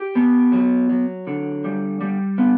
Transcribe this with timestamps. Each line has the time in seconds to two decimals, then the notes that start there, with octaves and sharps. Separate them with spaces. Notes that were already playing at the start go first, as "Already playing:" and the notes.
Already playing: G4
0.15 B3
0.52 F#3
0.89 F#3
1.27 D3
1.64 G3
2.01 G3
2.38 B3